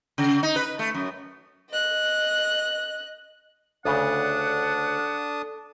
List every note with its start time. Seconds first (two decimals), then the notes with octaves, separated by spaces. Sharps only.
0.18 C#3
0.43 D#4
0.56 B4
0.79 A3
0.94 F#2
1.70 D#5 F#6
3.85 D2 C#3 D4 A4 F#5 A5 D#6